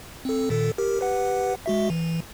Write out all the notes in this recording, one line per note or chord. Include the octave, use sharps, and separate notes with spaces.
C4 A4
A#2 D#3 A4
G4 A#4
G4 B4 F#5
G#3 F#4 E5
E3